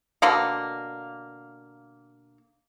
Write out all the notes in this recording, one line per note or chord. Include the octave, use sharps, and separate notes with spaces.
B2 D3 A#3